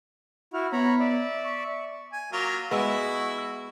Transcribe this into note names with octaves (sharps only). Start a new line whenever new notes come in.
E4 F#4 F6
B3 C#5 A#5 B5
D5 E5
C#6
G#5
F#3 A#3 F4
G#3 B3 E4 F#4 E5